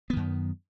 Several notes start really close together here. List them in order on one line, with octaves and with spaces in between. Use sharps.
B3 D#3 F#2